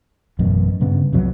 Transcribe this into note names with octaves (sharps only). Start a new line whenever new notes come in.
A1 F#2 B2
G2 C#3 B3
C2 F2 F#3 B3